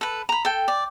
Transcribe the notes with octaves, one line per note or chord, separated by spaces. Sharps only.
A4 B4
A#5 B5
A4 G5
D5